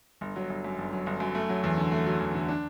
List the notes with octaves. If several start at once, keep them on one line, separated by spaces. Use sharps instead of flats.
G1
F#3
G1
F#2
G1
F#3
G1
F#2
A3
F#3
E2
D3
A3
F#3
E2
D3
D4